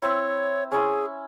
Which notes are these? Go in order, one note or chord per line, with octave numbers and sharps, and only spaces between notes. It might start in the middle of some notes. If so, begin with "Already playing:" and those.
C4 E4 C#5
C#4 E4 G#4